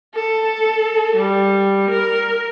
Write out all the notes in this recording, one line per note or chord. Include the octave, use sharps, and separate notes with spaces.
A4
G3
A#4